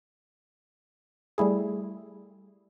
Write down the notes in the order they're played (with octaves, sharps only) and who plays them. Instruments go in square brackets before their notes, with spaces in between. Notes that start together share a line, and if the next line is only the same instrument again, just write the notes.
[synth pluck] G3 A3 E4 G#4